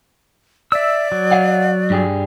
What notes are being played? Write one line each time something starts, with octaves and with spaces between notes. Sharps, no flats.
D5 E5 E6
F#3
D#5 F5 F#5
G2 G3 G#4